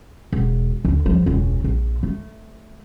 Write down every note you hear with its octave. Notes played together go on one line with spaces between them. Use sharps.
E1
D2
E2 F3
E1 C#2
A#1
A3